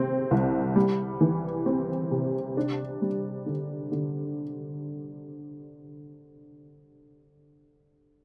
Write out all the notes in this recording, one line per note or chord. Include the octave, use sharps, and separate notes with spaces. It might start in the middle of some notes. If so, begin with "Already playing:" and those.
Already playing: C3 C4
C2
G3
E3
C4
C3
D4
G3
D3
D3